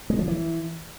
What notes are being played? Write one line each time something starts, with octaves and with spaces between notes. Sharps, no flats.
G#3
F3
E3